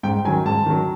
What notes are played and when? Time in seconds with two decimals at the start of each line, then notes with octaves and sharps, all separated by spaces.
0.03 G#2 G5
0.25 D#3 F#3 G#5
0.45 G#2 A5
0.66 D#3 F#3